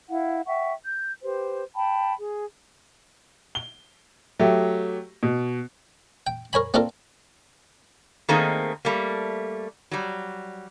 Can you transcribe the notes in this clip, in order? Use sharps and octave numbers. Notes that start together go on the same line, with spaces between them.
E4 F5 F#5
E5 F#5 G5 C#6
G6
G4 B4 C5
G5 A5 B5
G#4
G7
F#3 A3 G4
B2
G5
A#4 C#5 G#5 B5
A#3 C4 D4 F4 A4 A#4
D#3 A3 A#3 C4 D#4 G#4
G3 A3 A#3
F#3 G3